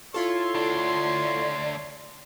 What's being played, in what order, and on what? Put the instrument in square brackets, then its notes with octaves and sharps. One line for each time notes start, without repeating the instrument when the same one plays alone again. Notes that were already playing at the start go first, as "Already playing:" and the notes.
[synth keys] E4 F4 A4 [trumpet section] C#5 C6
[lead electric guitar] D2 D4